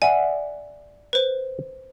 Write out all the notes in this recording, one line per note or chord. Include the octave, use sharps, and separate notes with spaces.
D5 E5 F#5 G#5
B4 C5